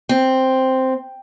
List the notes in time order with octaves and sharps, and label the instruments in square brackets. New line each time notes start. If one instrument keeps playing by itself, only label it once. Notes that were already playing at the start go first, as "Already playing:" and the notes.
[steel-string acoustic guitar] C4